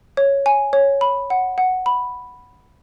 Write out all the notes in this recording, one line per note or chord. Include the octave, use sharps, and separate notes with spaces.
C#5
G#5
C#5
B5
F#5
F#5
B5